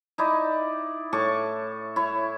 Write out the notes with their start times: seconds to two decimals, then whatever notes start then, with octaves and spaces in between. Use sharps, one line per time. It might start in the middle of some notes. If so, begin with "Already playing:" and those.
0.18 D#4 E4 D5
1.13 A2 A5 C#6 D6
1.96 E4 C#5